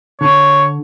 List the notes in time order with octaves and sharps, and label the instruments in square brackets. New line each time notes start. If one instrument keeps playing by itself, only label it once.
[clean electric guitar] D3 [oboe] C#5